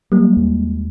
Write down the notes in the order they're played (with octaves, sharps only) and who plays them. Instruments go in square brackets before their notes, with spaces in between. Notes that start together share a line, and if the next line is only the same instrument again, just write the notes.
[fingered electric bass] F#3 [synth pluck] G3 A#3
[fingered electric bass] D#2 G#3